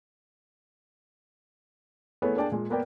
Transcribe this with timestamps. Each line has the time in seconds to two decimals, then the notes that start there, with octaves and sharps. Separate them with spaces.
2.22 A3 B3 E4 G#4 B4 C#5
2.36 A#3 D4 G#4 D5 G5 A5
2.52 A#2 G#3
2.70 A#3 B3 A#4 B4 D5 G5